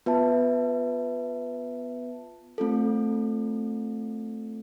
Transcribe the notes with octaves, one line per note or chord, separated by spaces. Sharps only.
B3 F4 B4 E5 A5
A3 C4 F4 A4